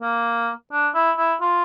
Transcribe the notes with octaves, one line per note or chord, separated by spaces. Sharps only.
A#3
D4
E4
E4
F4